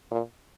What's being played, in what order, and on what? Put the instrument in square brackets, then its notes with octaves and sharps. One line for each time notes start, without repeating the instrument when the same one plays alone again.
[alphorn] A#2